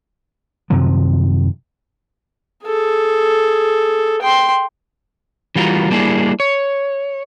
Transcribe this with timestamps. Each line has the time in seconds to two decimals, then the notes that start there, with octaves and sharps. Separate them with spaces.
0.70 F#2 C3 D#3 F3
2.65 G#4 A4
4.22 G5 C6
5.56 E3 G3 F4 F#4 A#4
5.90 G3 A#3 D4 E4 G#4
6.40 C#5